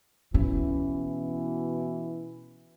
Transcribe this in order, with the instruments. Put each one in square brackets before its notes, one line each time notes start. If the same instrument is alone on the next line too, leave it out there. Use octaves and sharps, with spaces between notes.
[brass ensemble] B2 E3 [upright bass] C#4